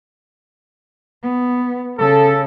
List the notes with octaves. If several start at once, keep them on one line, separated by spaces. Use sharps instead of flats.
B3
C#3 A4